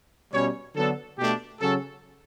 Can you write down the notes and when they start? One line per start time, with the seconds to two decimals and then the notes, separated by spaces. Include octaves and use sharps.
0.32 B2 G3 C#4 C#5
0.75 D3 F#3 B3 D4 A4
1.18 B2 A3 D4 G4
1.61 C#3 F#3 C#4 A4